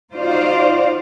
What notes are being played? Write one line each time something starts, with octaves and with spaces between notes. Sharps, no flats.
D#4 F4 F#4 C5 D5 F5